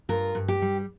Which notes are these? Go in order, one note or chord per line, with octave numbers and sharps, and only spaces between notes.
G2 F4 A#4
G2
G4
G3